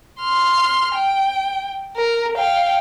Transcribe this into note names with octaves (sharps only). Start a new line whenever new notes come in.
C6 F6
G5
A#4
F5 G5